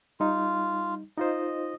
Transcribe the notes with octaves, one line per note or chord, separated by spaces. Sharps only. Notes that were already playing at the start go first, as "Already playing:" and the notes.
G3 D#4 F4
D#4 F4 C5 D#5